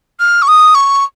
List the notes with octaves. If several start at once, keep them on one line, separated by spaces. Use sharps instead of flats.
F6
C#6
D#6
C#6